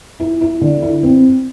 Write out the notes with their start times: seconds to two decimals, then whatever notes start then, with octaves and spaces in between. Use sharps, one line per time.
0.20 E4
0.41 E4
0.61 D3
0.82 E4
1.03 C4